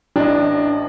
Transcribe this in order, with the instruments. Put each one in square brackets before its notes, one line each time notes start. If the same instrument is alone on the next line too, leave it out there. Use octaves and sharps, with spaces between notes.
[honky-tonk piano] A1 D5 D#5 [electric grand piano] D4